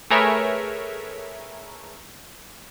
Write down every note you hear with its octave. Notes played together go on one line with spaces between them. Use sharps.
A3 G#4 A#4 B4 C#5 E5